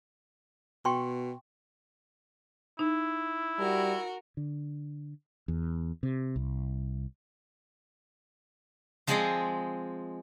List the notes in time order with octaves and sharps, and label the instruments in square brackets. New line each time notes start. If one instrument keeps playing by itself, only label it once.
[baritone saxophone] B2 [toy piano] G5 C6 C#6
[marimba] D#4 [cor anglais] E4
[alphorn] G3 [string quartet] F#4 A#4
[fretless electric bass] D3
E2
C3
C2
[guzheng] F3 G#3 C4 G#4 D5 D#5